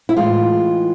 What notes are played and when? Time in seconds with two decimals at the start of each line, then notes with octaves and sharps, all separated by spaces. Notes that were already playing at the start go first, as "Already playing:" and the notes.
0.09 E4
0.17 A2 E3 G#3 F4